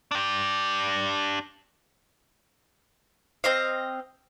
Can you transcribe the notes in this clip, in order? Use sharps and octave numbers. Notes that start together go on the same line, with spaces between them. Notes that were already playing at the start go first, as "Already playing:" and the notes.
D4 G4
C4 D#5 F5